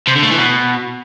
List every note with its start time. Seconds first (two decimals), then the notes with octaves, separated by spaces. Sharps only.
0.08 C3
0.16 D3
0.23 A3
0.31 E3
0.39 B2